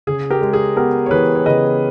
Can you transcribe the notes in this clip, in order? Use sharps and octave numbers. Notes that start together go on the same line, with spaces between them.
C#3 G#4
G4 A#4
G#3
G#4
B3 G4 A#4
C#5
E3 G#4 B4
C#5
C#3 B4 D#5